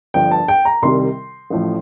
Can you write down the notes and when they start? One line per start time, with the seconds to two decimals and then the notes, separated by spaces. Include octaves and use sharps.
0.14 G1 G2 F3 G5
0.31 A5
0.48 G5
0.65 A#5
0.82 C2 C3 D#3 G3 C6
1.50 A1 A2 F3